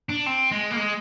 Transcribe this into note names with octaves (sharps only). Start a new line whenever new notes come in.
D4
C4
G#3
A#3
G#3